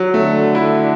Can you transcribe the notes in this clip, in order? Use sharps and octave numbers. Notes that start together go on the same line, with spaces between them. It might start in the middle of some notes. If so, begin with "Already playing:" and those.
Already playing: F#3
D3 A3
E4